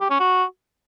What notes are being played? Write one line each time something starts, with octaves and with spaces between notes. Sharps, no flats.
G4
C#4
F#4